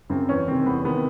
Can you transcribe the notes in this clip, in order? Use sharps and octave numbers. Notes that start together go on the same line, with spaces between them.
F#2 C#3 C4
E2 C#4
C3 D#3 C4
E2 B3
C3 D#3 B3